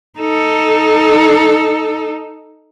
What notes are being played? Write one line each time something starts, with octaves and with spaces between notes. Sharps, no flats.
D#4 A4